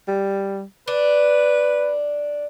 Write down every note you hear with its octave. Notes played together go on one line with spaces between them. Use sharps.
G3
D4 B4